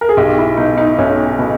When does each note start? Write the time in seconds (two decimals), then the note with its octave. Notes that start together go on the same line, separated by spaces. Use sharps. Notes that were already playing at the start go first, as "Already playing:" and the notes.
0.01 A#4
0.09 G#4
0.17 B1 G4
0.38 E4
0.57 B2 D#4
0.77 D#4
0.98 B1 C#4
1.39 B2